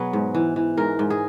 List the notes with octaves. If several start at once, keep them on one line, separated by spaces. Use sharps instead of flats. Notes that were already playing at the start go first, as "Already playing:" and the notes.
Already playing: B2 F#3 G#4 B4
G#2
E3
E3
G#2 A#4
G#2
G#4